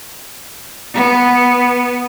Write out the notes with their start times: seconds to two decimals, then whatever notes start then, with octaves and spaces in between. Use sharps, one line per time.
0.94 B3